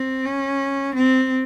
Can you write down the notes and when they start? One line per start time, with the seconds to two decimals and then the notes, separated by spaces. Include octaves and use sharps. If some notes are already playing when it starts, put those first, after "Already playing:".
Already playing: C4
0.25 C#4
0.95 C4